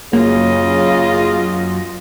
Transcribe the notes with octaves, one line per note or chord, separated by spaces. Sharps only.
F#2 C#3 A#3 F4 D#5